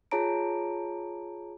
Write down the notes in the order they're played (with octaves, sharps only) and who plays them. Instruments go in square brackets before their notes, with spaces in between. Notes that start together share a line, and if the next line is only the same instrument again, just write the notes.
[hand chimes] F4 G#4 C#5 A5 A#5 D7